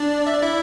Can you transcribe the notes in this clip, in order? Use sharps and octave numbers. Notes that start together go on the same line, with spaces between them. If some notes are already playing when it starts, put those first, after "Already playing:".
Already playing: D4 D5
E5
D5
E4 E5